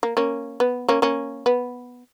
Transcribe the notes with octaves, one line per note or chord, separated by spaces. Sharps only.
A#3
A#3 C#4
B3
A#3 C#4
A#3 C#4
B3